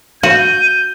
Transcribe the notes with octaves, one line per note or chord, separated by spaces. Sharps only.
F#4 F5 G6 D#7